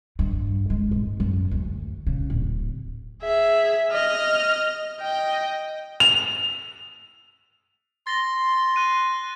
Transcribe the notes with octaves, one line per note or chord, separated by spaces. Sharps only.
G2
G#3
G#1
F#2
D2
C#3
D1
G#4 E5
D#5 F6
D#5 G5
F7
C6 A6 A#6 G7
F#6 D#7